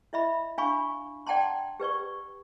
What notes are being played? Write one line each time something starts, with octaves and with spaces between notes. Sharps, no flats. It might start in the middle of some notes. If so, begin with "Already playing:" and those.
E4 D#5 E5 B5
D4 F5 G#5 B5 C#6
D5 F#5 G5 A5 A#5 C6
G4 B4 D5 C#6